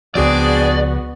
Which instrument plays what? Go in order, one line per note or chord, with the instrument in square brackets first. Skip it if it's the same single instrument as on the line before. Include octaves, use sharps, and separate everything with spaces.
[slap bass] C#2 F3 [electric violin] B3 F#4 [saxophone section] C4 D4 G#4 [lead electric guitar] D5